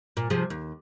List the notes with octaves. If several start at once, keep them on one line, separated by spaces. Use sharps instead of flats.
A#2
C3 F3 G#4
D#2